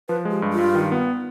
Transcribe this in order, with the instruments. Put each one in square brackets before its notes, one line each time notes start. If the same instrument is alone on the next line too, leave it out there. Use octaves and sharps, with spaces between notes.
[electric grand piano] F3 [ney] B4
[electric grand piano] G#3
[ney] G4
[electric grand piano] G2
[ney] F4
[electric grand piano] G2
D#3
B3